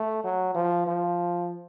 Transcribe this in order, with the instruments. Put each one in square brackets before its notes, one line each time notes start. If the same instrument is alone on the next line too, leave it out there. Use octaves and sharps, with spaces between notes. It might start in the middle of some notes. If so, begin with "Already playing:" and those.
Already playing: [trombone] A3
F#3
F3
F3